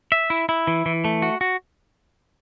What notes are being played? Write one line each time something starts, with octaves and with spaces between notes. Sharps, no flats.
E5
E4
E4
E3
E3
A3
F#4
F#4